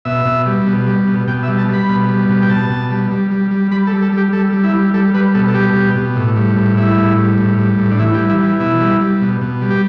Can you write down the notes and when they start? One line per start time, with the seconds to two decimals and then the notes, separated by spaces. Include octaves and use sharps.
0.05 B2 E5
0.25 B2
0.46 G3
0.66 B2
0.87 G3
1.07 B2
1.27 B2 G5
1.43 E5
1.48 G3
1.58 A5
1.68 G3
1.73 B5
1.89 B2
2.09 G3
2.29 B2
2.42 G5
2.49 B2 A5
2.70 B2
2.90 G3
3.11 G3
3.31 G3
3.51 G3
3.71 G3 B5
3.87 A4
3.92 G3
4.02 A4
4.12 G3
4.17 G4
4.33 G3 A4
4.53 G3
4.63 E4
4.74 G3
4.94 G3 A4
5.14 G3 B4
5.35 B2 A4
5.48 A4
5.54 G3 G4
5.75 B2
5.95 B2
6.16 A2
6.36 G3
6.56 A2
6.77 G3 E4
6.97 A2
7.17 G3
7.38 A2
7.58 G3
7.78 A2
7.91 D4
7.99 E3 E4
8.14 G4
8.19 G3
8.30 E4
8.40 E3
8.60 B2 E4
8.81 G3
9.01 G3
9.22 B2
9.41 B2
9.61 G3
9.70 G4